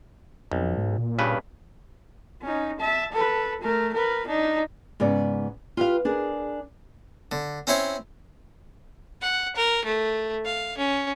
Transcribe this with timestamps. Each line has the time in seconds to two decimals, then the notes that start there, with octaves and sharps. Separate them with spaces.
0.52 B1 F2
0.77 G#2
0.98 A#2
1.19 G2 C#3 B4
2.42 C#4 D#4
2.80 E5 A5
3.12 A4 B4
3.61 A3 A#4
3.94 A#4 B4
4.26 D4 D#4
5.00 G#2 C#3 B3 D5
5.77 F4 G4 B4 F5
6.05 D4 G#4 A#4
7.32 D3
7.67 C4 C#4 E4 C5 C#5
9.22 F#5
9.56 A#4
9.85 A3
10.45 F5
10.78 C#4